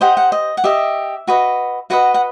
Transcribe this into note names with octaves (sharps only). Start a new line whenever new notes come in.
G4 C5 D#5 F#5
F#5
D#5
F#5
G4 D#5 E5
F#4 B4 D#5
F#4 B4 D#5 F#5
F#5